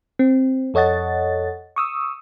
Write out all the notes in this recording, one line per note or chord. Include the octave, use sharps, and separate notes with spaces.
C4
F2 A4 C#5 D#5 F#5 A6
C#6 D#6 E6